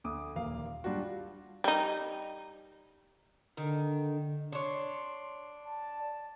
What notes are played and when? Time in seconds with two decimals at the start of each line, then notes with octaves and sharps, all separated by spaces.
0.04 D2 D6 D#6
0.36 D#1 A#3 F5
0.84 F#3 G3 D4 F4 F#4
1.64 G3 D#4
3.57 D3 D#3
4.52 D4 C#5 C6
5.65 A5